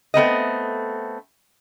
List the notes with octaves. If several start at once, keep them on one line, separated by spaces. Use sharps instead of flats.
A3 B3 C4 D#5